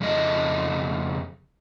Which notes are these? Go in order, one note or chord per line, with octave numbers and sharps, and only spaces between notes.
F2 C#3 A4 D#5